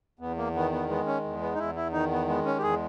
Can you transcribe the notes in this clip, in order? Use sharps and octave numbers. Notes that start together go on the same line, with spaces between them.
E2 B3
A#3
D#3 B3
B3
G#3 B3
C#4
E2
B3
D#4
E2 E4
E4
D#3 D#4
B3
G#3 B3
C#4
G4
E2 G#4